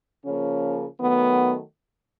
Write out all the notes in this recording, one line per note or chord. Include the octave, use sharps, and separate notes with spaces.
C#3 F3 A#3 C#4
D#3 F#3 A3 B3